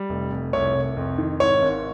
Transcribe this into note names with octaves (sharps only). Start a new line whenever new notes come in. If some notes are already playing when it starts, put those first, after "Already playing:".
Already playing: G3
F1
F1
C2 C#5
C2
F2
D#3
G#2 C#5
G#1